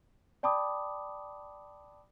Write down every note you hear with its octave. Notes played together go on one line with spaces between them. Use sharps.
D5 G5 A5 B5 D6 D#6